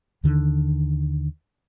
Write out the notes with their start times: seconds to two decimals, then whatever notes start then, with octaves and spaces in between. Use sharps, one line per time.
0.24 D#2 D3 D#3